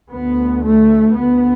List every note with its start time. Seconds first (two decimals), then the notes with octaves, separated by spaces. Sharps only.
0.12 D2 B3
0.64 A3
1.16 D2 B3